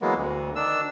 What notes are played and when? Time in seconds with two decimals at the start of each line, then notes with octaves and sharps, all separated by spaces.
0.02 E3 F#3 G#3 A#3 B3
0.16 D2
0.56 D#3 D4 E6